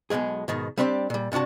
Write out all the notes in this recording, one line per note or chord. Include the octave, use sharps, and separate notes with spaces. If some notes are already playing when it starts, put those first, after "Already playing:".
B1 G2 B2 G#3 G#4
G#2 B2 D#3
G3 C4 D4 G4 C6
A#2 G3
G2 C3 D4 F#4 A5